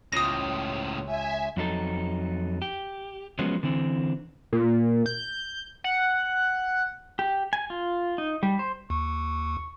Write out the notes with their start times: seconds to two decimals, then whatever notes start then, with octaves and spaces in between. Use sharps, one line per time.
0.12 C#2 A2 C#3 F4 G4 D#6 A#6
1.05 E5 G#5
1.57 F2 F#3 D#4 A4
2.62 G4
3.39 F3 F#3 G#3 B3 C#4
3.63 D3 E3 C4
4.53 A#2
5.06 G6
5.84 F#5
7.19 G4
7.53 G#5
7.70 F4
8.18 D#4
8.43 G3
8.59 C5
8.90 D#2 C#6